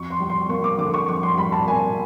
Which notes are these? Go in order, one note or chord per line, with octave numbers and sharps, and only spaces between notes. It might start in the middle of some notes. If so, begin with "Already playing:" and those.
Already playing: F2 C#6
C6
G3
C6
A#3 C#6
D6
D3 D6
C#6
F2 C#6
C6
G3 B5
A5
A#3 G#5